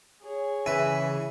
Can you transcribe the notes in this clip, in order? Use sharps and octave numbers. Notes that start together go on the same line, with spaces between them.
G#4 C#5
C#3 E3 B4 E5 G#5